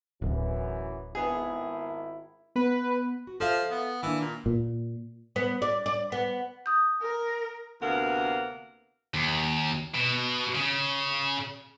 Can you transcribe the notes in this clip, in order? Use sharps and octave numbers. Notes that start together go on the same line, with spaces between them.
D1 F#2 E3
G#1 D#3 B3 E4 G#4
B3 B4
F#4
F3 A4 E5 F5
B3
D#3 E3 A#3 D4
A#2
A#2
B3
D5
D5
B3
D#6 G6
A#4
D2 C3 A#3 B3 A#4 F#5
D#2
B2
C#3